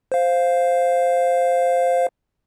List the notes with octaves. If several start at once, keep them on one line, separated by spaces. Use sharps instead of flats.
C5 F5